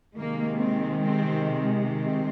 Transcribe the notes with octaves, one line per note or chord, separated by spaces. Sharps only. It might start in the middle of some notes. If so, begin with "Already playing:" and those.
C3 D#3 G#3 A#3
C4
C4
C4